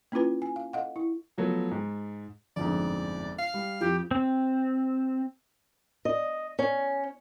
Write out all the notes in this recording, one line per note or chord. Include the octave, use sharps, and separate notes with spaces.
A#3 C#4 E4 F4 B4
G#5
F5
A4 D#5 F5 F#5
E4
F3 F#3 A3 B3
G#2
G1 F2 G#2 D5
F5
G3
F2 F3 G4
C4
D#5
C#4